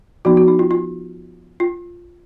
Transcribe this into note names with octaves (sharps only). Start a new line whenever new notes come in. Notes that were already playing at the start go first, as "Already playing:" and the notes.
F3 B3 D#4 F#4
F#4
D#4
F4
F4
F4